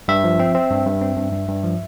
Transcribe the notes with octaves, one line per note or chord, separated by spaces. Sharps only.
G2 E5
F3
C4
C4
G2
G2
C4
G2
G2
G2
F3